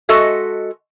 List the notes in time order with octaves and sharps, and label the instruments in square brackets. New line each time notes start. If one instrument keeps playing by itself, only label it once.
[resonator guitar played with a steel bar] G#3 F#4 A4 D#5 E5